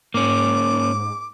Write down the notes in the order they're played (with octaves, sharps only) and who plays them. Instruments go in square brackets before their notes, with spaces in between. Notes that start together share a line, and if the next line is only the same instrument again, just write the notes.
[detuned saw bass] G#2 [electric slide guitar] A#3 C#4 [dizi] D6